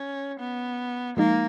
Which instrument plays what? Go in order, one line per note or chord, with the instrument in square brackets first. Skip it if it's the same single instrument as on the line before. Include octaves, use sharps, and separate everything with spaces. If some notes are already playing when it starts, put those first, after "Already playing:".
Already playing: [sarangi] C#4
B3
[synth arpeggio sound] F3 G#3 D#4 [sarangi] A#3